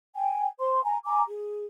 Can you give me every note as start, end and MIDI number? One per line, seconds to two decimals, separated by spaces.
0.15 0.46 79
0.15 0.46 80
0.59 0.81 72
0.59 0.81 84
0.84 0.97 80
0.84 0.97 82
1.06 1.23 80
1.06 1.23 82
1.06 1.23 86
1.28 1.65 68